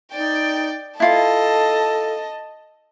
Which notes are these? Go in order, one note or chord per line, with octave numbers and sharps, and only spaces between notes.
D#4 D5 G5
E4 F4 A4 D#5 A5